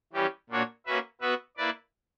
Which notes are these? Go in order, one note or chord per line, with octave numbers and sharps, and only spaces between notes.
E3 G3 C#4 G4
A#2 A#3 D4 F#4 C#5
A#3 C#4 F#4 B4 E5
B3 F#4 B4 E5
A#3 E4 B4 D5